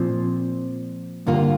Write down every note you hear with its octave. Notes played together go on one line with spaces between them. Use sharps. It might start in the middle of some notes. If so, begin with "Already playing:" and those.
Already playing: A#2 F3 C4
G2 D3 A#3 F4